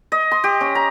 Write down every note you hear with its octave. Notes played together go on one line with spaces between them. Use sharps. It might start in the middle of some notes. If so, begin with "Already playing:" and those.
D#5
C6
G4
C#4
A#5